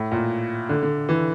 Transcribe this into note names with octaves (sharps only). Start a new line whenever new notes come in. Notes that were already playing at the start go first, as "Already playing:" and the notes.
Already playing: A2
A#2
D3
D3
E3